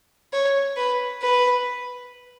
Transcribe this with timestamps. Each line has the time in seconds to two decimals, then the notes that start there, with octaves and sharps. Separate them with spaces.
0.33 C#5
0.77 B4
1.22 B4